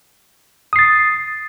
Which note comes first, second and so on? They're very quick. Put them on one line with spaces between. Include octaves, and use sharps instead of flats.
D#6 C7 A6